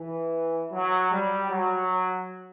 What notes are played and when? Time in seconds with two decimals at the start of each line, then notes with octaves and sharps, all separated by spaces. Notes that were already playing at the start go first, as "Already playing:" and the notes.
Already playing: E3
0.72 F#3
1.12 G3
1.51 F#3